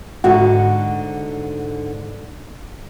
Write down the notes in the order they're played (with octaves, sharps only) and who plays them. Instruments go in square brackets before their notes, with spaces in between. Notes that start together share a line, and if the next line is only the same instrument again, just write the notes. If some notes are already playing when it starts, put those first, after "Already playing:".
[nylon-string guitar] G#2 D3 [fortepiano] F#4